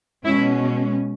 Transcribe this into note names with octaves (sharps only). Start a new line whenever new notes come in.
B2 G#3 C#4 E4